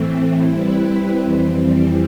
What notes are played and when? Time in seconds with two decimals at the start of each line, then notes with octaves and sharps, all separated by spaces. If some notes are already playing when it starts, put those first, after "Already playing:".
Already playing: A2 E3 A3 C4
0.48 G3 C4 E4 B4
1.19 F2 E3 G3 C4